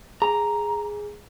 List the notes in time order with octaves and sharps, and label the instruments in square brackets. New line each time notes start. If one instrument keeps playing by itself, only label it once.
[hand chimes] G#4 [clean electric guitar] A#5